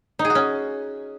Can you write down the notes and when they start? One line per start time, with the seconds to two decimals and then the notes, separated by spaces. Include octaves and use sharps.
0.19 D#4
0.25 G#4
0.30 F#4
0.35 C#4